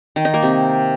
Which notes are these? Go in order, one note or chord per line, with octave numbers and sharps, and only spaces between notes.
D#3
D#4
A#3
C3